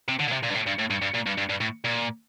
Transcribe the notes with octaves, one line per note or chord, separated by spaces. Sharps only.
C3
D3
A#2
C3
A#2
G2
A2
G2
A2
G2
G2
A#2
G2
G2
G2
A2
A#2